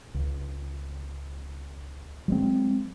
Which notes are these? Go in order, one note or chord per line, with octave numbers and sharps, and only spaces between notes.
C#2
F#3 G#3 C4